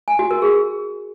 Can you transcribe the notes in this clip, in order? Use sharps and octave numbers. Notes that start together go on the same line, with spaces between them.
G#5
F#4
A#4
G#4